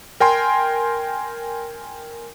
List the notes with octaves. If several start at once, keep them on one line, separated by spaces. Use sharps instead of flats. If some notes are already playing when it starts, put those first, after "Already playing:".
A#4 G5 G#5 C6